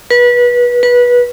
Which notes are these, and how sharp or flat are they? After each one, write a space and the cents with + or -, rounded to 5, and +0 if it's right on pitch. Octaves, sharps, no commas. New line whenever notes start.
B4 -25
B4 -20